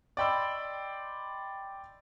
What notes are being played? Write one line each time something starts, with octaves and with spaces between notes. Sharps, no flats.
D5 D#5 G5 B5 C6 E6